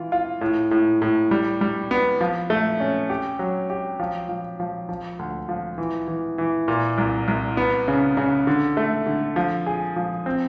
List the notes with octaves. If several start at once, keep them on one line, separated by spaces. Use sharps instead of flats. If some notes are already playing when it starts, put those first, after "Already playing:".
Already playing: E3 F4
F4
A2
A2
A2
G3
G3
B3
F3
A3
C#4
G4
F#3
G4
F3
F3
F3
F3
D2
F3
E3
E3
E3
A#2
C2
C2
B3
C#3
C#3
D3
A3
D3
F3
G#4
F3
C4